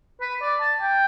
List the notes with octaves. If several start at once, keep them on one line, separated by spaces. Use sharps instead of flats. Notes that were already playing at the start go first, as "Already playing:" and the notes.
B4
D5
A5
G5